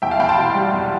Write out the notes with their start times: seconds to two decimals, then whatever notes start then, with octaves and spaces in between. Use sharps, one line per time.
0.02 E2 E5 G5
0.11 F5 A5
0.19 E2 G5 B5
0.29 A5 C6
0.38 B2
0.54 G3
0.73 E2